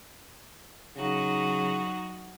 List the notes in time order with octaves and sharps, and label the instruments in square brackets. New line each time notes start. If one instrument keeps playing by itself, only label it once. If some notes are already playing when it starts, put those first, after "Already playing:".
[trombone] C#3 [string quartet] F#3 D#4 F#4